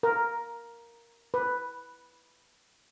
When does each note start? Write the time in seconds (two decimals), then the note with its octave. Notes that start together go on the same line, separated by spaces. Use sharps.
0.03 A#4
1.34 B4